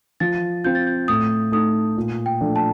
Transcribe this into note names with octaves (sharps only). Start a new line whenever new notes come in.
F3 A6
C4 F4 G6
A6
G6
A2 D#6
A3 D#4 D#6
A#2
G5
F3 A3 D4
A5